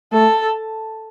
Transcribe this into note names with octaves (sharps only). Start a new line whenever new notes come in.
A3 A4